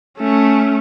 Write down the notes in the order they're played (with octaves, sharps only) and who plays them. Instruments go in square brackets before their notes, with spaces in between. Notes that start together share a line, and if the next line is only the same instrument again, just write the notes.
[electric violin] A3 C#4